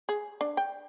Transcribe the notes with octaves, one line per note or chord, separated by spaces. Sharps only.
G#4
D4
G5